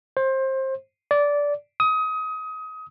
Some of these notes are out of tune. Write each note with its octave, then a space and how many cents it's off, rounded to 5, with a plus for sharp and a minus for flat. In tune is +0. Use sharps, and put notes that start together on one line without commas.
C5 +25
D5 -15
D#6 +25